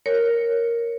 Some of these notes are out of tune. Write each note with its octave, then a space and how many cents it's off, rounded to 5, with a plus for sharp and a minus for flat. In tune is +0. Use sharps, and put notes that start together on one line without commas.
A#4 +0 C#5 +0